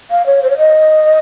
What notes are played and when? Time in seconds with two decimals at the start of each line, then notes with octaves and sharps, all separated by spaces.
0.11 F5
0.26 C#5
0.43 C5
0.51 C#5
0.58 D#5